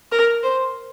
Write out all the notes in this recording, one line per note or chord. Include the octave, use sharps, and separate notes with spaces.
A#4
C5